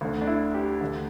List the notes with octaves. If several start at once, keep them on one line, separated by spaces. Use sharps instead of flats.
D2 D3
D4
E4
G4
D2 D3